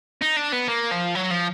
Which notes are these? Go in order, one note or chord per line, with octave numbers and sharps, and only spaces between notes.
D#4
D4
B3
A#3
F3
F#3
F3